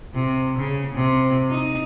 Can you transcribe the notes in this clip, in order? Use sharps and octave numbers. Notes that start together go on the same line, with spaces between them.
C3
C#3
C3
D#4